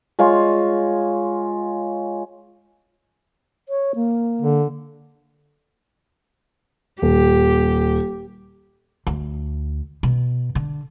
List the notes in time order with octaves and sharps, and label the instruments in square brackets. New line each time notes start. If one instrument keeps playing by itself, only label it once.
[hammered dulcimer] G#3 F4 C#5
[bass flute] C#5
A#3
[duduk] D3
[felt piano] D#1 [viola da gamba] G4
[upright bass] D2
B2
D3